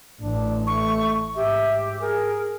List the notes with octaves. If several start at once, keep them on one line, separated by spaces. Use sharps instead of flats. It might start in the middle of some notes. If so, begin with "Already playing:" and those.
A1 D4
A3 C#6
G#2 G4 E5
G#4 A#4